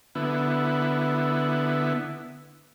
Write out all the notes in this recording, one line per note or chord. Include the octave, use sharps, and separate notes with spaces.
D3 B3 E4